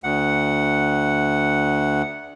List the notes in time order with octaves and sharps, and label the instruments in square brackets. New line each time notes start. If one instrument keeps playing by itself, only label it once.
[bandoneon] D2 F#5